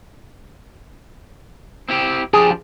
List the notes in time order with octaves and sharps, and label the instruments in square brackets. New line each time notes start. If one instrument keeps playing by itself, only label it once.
[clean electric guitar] C4 E4 G4
[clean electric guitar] F3 D4 G4 [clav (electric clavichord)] G#4